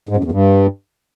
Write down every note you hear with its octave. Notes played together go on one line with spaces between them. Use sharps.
G#2
F#2
E2
G2